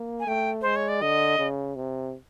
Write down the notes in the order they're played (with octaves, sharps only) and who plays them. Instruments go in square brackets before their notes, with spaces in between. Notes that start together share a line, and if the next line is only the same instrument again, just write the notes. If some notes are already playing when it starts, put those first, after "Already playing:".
Already playing: [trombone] A#3
[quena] G#5
[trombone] A3 [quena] G5
[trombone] G#3 [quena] C5
[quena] C#5
D5
[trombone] D3 [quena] D#5
[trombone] C#3
C3